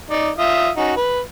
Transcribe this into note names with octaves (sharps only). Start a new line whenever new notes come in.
D#4 D5
F4 E5 D#6
C#4 D#4 F#4
B4